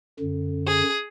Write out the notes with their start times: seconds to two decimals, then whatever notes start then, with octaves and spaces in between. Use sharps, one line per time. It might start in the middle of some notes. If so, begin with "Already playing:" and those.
0.19 F#2 D3
0.67 G#4